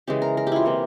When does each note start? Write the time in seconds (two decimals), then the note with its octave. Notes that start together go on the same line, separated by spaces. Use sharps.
0.08 C#3 E3 G#3 G4
0.22 A#4
0.37 A#4
0.47 G4
0.52 E4 F4
0.65 C3 E3 A#3